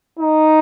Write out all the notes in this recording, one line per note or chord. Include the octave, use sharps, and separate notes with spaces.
D#4